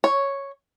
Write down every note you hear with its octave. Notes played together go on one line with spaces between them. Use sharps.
C#5